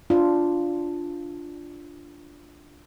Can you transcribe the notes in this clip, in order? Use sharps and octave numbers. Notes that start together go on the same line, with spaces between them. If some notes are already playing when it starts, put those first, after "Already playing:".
D4 F4